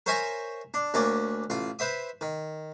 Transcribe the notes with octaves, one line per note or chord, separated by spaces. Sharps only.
A#4 C5 C#5 E5 G#5 A#5
D4
D2 A#3 C#4 D5
A1 F4
B4 C5 E5 D#6
D#3